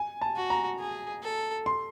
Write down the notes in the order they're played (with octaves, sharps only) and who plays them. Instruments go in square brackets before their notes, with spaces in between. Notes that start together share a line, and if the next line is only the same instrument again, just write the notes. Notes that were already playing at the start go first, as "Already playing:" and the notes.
Already playing: [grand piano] G#5
A5
[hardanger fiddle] F#4
[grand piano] A#5
[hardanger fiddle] G#4
A4
[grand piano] C6